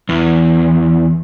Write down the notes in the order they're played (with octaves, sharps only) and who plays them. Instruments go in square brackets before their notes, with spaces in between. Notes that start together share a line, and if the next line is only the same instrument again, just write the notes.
[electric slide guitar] E2